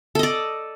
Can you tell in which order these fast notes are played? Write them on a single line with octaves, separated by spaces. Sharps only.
A4 D#5 D5